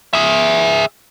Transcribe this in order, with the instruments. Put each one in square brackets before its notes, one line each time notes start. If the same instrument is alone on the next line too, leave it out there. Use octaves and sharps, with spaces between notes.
[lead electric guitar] G#4 E5